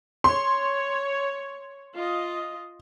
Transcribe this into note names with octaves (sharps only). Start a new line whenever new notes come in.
C#5 C6
F4 D#5